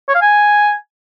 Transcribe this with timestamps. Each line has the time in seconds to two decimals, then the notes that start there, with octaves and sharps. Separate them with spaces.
0.08 C#5
0.15 F5
0.21 G#5